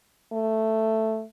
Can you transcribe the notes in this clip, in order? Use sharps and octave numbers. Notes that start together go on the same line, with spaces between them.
A3